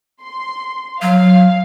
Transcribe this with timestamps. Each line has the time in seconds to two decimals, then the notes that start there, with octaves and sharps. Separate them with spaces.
0.24 C6
1.02 F#3 F5